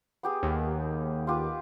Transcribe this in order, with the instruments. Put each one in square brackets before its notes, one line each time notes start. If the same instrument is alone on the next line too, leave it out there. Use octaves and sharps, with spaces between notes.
[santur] B3 G4 G#4
[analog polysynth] D#2
[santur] F4 G4 B4